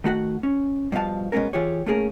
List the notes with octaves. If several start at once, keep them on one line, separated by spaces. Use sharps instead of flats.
D#3 A3 F#4 F#5
C#4
G2 B2 F3 F5 A5
B2 G#3 A#3 B3 C#4 A#4
E3 F4 G4 G#4 C#5
A3 A#3 C#4 G#4 A#4